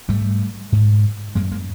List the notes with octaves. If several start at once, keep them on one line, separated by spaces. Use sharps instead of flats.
G#2 G3 A3
G#2
F#2 G#3 A#3
G#3 A#3